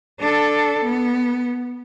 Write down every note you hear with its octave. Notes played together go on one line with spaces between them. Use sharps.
D4 A4
B3